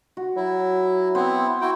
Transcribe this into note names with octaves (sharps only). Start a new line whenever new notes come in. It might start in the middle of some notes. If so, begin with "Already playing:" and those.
F#4
F#3 E4
B3 C4 E4 C5
E4 F#4 G5